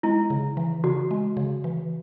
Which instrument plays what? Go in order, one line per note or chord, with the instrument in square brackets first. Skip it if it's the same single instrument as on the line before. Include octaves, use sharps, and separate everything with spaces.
[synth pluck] G#3 [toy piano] E4
[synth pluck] C#3
E3
[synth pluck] C#3 [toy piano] F#4
[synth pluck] G#3
C#3
E3